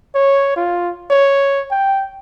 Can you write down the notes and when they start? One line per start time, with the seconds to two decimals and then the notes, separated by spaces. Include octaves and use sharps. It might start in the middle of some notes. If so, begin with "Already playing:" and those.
0.15 C#5
0.56 F4
1.10 C#5
1.71 G5